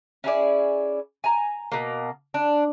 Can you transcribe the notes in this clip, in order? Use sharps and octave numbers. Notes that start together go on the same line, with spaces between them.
C#4 E4 G#4 D5
G#5 A#5
B2 A#3
D4